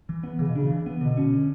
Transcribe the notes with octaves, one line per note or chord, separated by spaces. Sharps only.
E3
B3
C#3 E3
B2
C#3 D4
E3
B3
B2 D3
C#4
D3